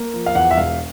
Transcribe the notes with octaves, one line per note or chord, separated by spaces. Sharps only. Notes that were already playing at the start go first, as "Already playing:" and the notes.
Already playing: A#3
F3
F5
E2 F#5
E5
E1 F5